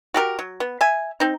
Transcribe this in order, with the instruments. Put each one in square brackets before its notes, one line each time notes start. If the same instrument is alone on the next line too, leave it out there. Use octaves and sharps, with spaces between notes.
[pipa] F#4 G4 A4 A#4
F#3
B3
E5 G#5
C4 D#4